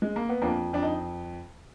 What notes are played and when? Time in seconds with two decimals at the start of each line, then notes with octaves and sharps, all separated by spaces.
0.02 G#3
0.16 A#3
0.29 B3
0.42 F2 A#3 D4
0.73 F2 D4
0.83 D#4